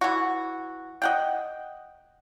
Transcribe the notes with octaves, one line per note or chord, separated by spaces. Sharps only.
E3 F#4
D#5 F#5 G5